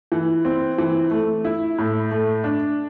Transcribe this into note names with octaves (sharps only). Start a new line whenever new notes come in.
E3
C4
E3
A3
E4
A2
A3
D4